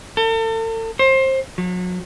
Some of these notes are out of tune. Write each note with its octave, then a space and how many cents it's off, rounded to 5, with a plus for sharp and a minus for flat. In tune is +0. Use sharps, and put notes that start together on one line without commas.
A4 +40
C5 +25
F#3 -35